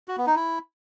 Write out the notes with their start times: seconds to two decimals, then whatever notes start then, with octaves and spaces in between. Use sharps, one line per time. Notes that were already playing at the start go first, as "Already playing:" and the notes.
0.08 F#4
0.17 B3
0.27 D#4
0.36 E4